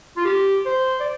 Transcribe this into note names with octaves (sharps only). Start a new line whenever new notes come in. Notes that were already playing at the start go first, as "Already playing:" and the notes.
F4
G4
C5
D5